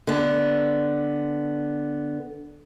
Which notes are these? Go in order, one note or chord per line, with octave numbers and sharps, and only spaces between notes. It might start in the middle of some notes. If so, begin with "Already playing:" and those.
D3 B3